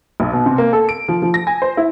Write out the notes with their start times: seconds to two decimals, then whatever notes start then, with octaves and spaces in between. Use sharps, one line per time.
0.20 B1
0.33 B2
0.46 C3
0.58 A#3
0.73 A4
0.89 D7
1.08 F3
1.22 F3
1.34 A#6
1.47 G#5
1.62 C5
1.77 E4